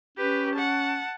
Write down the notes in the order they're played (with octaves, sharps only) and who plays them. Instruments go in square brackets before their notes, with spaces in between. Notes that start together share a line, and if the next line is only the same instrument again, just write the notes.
[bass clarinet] C#4 [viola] G4 B4
[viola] F#5 A5